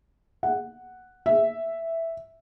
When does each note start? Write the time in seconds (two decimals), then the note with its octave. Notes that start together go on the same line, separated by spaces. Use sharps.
0.43 F#5
1.26 E5